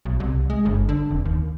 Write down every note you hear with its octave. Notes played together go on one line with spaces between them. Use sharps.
B1
C2
G#3
G1
D3
F1
D#2